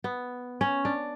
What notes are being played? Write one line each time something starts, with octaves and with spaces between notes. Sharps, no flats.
B3
C#4
D4